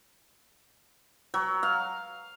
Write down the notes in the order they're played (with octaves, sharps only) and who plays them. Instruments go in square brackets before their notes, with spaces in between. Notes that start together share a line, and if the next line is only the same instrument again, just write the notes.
[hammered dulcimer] F#3
F5